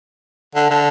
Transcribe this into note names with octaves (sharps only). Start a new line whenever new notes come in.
D3
D3